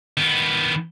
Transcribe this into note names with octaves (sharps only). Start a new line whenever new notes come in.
D#3 B3